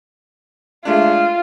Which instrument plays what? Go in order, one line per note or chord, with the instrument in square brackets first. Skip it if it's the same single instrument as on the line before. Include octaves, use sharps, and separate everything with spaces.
[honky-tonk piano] G#3 A3 D4 [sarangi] F4